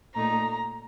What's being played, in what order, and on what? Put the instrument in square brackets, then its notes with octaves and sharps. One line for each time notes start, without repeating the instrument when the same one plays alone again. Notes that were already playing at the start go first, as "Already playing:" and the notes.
[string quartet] A#2 A3 D#4 A#5